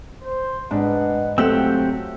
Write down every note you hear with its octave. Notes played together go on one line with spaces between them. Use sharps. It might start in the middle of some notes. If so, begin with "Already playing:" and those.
C5
G#2 D4 B4 D#5 F#5
F#3 A3 C4 F4 G4 F#5 E6